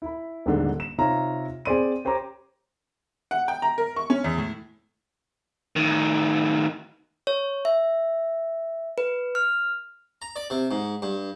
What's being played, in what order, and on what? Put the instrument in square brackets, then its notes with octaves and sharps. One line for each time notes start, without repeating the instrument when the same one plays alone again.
[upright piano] E4 B5
D#1 G#2 D3 D4
E7
C3 C4 D#4 F4 C#5 A#5
C4 G#4 C5 D5 C6 D#7
G4 C5 C#5 A#5 D6
[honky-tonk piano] F#5
G5
A#5
A#4
C#6
C#4
E2
A2
[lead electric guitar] A2 D#3
[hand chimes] C#5
E5
B4
F6
[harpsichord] A#5
D5
C3
G#2
G2